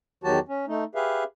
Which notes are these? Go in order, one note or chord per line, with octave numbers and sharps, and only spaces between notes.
E2 D#3 F#3 F#4 G4 A5
C#4
A3 D#4
G4 G#4 B4 E5 F5